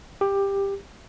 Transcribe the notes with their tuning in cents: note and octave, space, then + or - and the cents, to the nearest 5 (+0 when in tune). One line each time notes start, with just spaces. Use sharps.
G4 +15